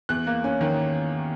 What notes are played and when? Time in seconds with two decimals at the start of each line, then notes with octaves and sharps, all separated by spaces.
0.09 E2 F#6
0.27 A#3
0.44 C#4
0.61 D#3